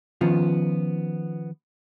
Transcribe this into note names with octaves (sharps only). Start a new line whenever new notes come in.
D#3 F3 B3 C#4 F4